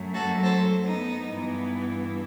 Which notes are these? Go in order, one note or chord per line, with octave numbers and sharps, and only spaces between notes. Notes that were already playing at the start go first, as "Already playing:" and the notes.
Already playing: F#2 F#3 A3
F#4 A4
A4 C5
B3 D#4
G2 E3 B3